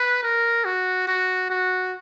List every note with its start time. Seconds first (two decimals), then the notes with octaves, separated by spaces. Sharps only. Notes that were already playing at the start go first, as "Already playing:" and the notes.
Already playing: B4
0.23 A#4
0.65 F#4
1.08 F#4
1.50 F#4